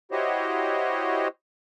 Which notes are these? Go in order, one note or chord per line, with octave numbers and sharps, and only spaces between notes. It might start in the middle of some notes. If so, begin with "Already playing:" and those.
E4 F#4 G4 C5 C#5 D#5